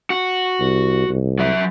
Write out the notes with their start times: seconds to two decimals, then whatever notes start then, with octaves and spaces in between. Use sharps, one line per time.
0.10 F#4
0.60 C2
1.09 C2
1.39 F#3 E5